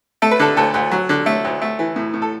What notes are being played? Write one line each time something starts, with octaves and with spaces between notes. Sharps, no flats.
A3 A4
B4
D3 A4
D2 A4
D2
F#3
D3
A3
D2
A3
E3
A2
A2
A4